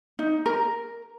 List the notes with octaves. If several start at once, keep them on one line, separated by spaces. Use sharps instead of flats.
D#4
A#4